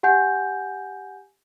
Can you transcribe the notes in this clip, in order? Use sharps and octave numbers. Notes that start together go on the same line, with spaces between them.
G4 F#5 G#5 G6